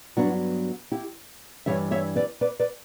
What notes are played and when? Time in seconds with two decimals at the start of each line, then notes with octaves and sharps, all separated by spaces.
0.17 G2 F#3 B3 D4 F#4
0.92 E4 G4
1.66 G2 E3 G3 C#5 E5
1.91 C#5 E5
2.16 B4 D5
2.41 B4 D5
2.60 B4 D5